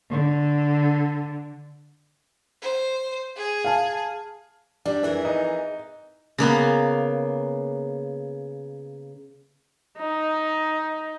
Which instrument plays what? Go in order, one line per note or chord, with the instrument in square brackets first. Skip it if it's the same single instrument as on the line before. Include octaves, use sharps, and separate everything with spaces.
[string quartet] D3
[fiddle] C5
G#4
[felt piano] F5 G#5 A5
[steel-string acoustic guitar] G3 [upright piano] D4
[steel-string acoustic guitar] F2 G#4 A#4 [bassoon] E3
[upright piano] D#4
[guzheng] C#3 A#3 B3
[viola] D#4